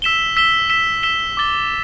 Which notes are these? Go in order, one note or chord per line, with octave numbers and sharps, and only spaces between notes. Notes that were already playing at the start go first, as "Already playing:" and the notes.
E6 B6 E7 G7
E6 B6 E7 G7
E6 B6 E7 G7
E6 B6 E7 G7
D6 A6 G7